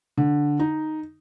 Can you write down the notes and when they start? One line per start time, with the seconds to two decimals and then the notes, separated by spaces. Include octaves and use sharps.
0.17 D3
0.59 D#4